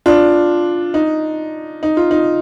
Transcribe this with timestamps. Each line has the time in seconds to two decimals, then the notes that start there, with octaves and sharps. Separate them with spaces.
0.06 D4 F4
0.94 D#4
1.83 D#4
1.97 F4
2.11 D#4